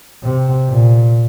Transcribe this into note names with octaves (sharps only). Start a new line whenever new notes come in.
C3
A#2